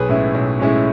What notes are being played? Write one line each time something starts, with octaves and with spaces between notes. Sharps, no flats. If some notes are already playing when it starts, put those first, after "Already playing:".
Already playing: B1 G#4 B4
A2 G#3 C#4 E4
B1
A2 G#3 C#4 E4